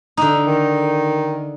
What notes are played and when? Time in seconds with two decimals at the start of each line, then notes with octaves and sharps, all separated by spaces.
0.17 D3 D#4
0.47 D#3